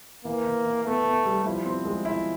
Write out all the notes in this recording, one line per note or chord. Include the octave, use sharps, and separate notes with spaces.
E3 A#3
E3
E3
A3 B3
B3
G3
F3 E4
C4
G#3
E4